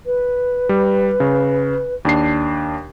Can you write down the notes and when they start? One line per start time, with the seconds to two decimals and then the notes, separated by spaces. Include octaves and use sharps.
0.06 B4
0.69 G3
1.20 C#3
2.05 D#2 D4 C7